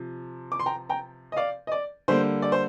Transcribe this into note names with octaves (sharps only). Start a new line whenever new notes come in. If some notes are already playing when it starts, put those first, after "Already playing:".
Already playing: C3 F3
D6
C6
G5 A#5
G5 A#5
D#5
D5 F5
D#5
D5
D3 G3 A#3 C5
D5
C5